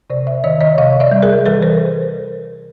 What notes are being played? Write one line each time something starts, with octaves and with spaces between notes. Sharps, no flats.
C3 C5 D5
D5 E5
D#3 C#5 D#5
C#5 D#5
C3 D#5 F5
D5 E5
G3
G#4 A#4
E3 A4 B4
A#4 C5